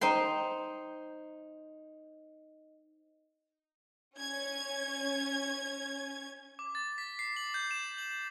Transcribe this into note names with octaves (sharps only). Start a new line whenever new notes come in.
D#4 C5 G5 C6
C#4 G#6
D6
A6
B6
C7
F#7
G6
E7
F#7